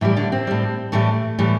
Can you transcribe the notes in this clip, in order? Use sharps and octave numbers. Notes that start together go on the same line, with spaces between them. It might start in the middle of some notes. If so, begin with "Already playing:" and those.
A2 E3 G3 E4
D3 D4
C4
A2 G3
A2 E3 G3 A3
A2 E3 G3